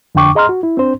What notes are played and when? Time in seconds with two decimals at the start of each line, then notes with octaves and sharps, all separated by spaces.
0.15 F2 D3 D4 G5 C#6 D6
0.35 G#4 D#5 A#5 C6 F6
0.49 F#4
0.63 E4
0.77 C4 D4 C5